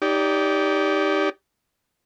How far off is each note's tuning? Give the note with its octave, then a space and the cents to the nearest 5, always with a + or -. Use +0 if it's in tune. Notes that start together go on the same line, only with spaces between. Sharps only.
D#4 +0 G4 +0 D5 -25